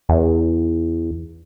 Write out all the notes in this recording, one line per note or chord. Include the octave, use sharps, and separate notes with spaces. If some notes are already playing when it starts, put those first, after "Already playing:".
E2